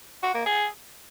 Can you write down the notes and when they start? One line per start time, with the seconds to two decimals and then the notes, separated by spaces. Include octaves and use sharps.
0.23 F#4
0.34 A#3
0.46 G#4